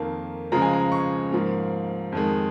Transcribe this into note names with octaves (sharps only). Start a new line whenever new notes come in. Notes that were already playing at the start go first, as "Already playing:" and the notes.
Already playing: F2 D#3 A#3
C#2 C#3 F3 G#3 A#5
G#5
A#5
C#6
G#2 F3 A#3
F2 D#3 G#3